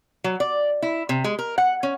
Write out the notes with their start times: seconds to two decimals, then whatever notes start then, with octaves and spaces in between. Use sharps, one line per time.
0.24 F#3
0.40 D5
0.82 E4
1.09 C3
1.24 G#3
1.39 A#4
1.58 F#5
1.83 C#4